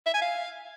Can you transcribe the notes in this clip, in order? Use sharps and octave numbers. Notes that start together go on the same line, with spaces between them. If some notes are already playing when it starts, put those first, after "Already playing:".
E5
G#5
F5